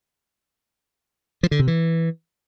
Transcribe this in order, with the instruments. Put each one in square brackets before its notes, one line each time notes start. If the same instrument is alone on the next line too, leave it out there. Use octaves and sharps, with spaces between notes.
[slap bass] F3
D3
C3
E3